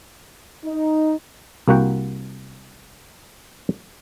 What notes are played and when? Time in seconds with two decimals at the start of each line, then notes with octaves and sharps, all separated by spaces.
0.66 D#4
1.68 C2 A#3 F#4 F#5 G5